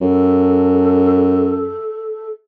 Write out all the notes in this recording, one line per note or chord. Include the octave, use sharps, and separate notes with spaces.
F#2 A4